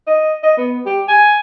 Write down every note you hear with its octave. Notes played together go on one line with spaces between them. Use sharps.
D#5
D#5
B3
G4
G#5